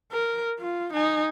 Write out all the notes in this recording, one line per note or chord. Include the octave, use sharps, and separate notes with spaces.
A#4
F4
D#4 G#5